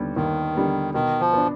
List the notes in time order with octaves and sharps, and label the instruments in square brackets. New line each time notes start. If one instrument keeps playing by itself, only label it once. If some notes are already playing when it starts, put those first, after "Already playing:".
Already playing: [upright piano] D#2 D3 G3 B3
[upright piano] D#2 [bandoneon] D#3
[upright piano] D3 G3 B3
[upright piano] B2 [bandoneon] D#3
[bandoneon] F3
[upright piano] B3 D4